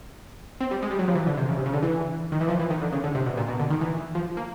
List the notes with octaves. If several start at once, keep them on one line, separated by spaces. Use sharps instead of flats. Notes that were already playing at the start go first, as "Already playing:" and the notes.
C4
G3
G#3
G3
F#3
F3
E3
D3
C3
C#3
C3
C#3
D3
E3
D#3
E3
F3
E3
D#3
D3
C#3
D3
C3
B2
A#2
B2
D3
D#3
E3
F3
A#3